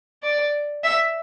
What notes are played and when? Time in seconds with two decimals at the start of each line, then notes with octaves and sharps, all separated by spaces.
0.23 D5
0.84 E5